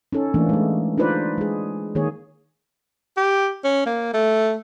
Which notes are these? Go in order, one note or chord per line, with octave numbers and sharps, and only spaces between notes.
C#4 D#4 A4
E3 A3 A#3 D4
G#3 A3
D4 D#4 F4 B4 C5 D5
G#3 G#4
D#3 A#3 G#4 C#5
G4
C#4
A#3
A3